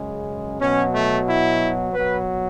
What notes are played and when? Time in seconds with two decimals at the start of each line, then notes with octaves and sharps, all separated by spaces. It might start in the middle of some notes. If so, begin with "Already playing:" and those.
Already playing: F#2 C#3 G#3
0.60 B2 F#3 C#4
0.93 A3
1.27 E4
1.92 B2 F#3 B4